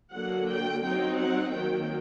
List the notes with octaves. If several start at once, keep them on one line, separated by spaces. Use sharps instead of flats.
D3 F#3 A#3 F#5
G5
F#3 C4 D#4 G5
F#5
D#3 F#3 A#3 G5